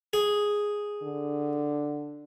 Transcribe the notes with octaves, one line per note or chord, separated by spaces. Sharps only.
G#4
D3